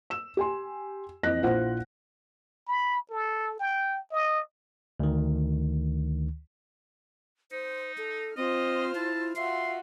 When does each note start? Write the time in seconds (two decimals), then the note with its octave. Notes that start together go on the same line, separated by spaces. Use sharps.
0.10 E6 E7
0.37 G4 G#5 C6
1.23 F2 E3 C4 D#5 F#6 A#6
1.42 A#1 E4 F4 C5 F#5
2.68 B5
3.11 A4
3.59 G5
4.12 D#5
5.00 D2 D#3
7.52 D#4 C5
7.98 A4
8.37 C4 F4 C5 D#5 F6
8.95 E4 A5
9.36 F4 F#4 E5 C6